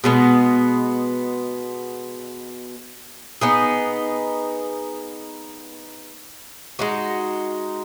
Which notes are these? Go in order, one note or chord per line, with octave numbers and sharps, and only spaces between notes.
B2 G#3 B3
B3 D#4 G#4
G#3 D#4 F#4